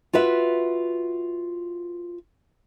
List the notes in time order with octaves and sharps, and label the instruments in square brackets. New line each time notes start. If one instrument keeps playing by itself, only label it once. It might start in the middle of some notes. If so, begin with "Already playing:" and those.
[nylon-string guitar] F4 F#4 B4 E5